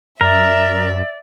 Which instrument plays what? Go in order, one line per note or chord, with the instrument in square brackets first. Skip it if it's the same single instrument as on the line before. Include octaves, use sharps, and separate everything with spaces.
[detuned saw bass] F#2 [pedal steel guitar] A#4 [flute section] D5 [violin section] E5